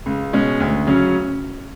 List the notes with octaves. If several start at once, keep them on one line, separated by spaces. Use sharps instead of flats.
C#2
B2 G#3 C#4
D2
C#3 F#3 C#4